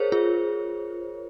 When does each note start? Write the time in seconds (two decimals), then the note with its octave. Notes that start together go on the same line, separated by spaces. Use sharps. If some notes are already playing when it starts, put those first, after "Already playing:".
Already playing: G#4 A#4 C5 C#5
0.12 F4 G#4